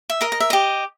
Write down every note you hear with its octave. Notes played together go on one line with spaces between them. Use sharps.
E5
A#4 D#5
D#5
E5
G4 D#5